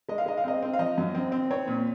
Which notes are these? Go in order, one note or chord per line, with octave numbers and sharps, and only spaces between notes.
G#3 D#5
F5
G#3 D#5
F5
C4 D#5
C4
F5
F3 D#5
F#2
C4
C4
C4 C#5
A#2